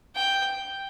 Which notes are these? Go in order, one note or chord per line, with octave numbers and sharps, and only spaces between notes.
G5